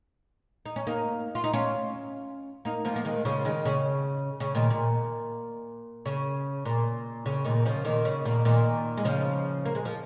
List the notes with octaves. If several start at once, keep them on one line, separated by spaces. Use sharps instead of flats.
D#4
C#4
A#3 D#4
F4
D#4
C#4 F4
A#3 D#4
F3 A#3
A#3
D#3 G#3
C#3 F3
D#3 G#3
C#3
C#3
A#2 D#3
A#2
C#3
A#2
C#3
A#2 D#3
C#3 F3
A#2 D#3
C#3
A#2 D#3
A#2 D#3
G#3
C#3 F3
A#3
G#3
F3